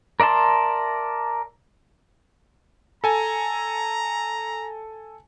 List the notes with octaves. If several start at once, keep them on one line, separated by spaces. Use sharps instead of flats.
A#4 D5 E5 A5 C6
A4 G#5 A#5